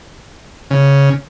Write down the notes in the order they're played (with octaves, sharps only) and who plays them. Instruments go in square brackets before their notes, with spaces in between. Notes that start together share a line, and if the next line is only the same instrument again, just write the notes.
[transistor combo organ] C#3